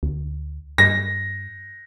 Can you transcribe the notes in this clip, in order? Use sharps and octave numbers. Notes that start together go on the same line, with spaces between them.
D2
G2 A#6